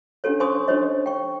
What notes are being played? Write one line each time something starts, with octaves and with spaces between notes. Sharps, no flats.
C#4 D4 G4 A4 C#5
C5 G#5 C6 C#6 D#6
D4 D#4 G4 C5 C#5 D#5
G5 C#6